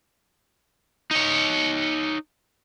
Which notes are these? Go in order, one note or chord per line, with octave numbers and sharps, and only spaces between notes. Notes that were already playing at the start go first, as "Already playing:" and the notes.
D#4 C#5